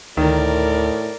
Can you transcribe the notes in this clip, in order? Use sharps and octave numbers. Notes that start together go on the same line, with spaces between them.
D2 A2 D#3 A#4 D5